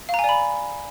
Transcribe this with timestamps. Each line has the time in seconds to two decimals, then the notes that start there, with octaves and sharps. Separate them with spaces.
0.09 F5
0.14 A#5
0.19 G#5
0.24 D5
0.29 B5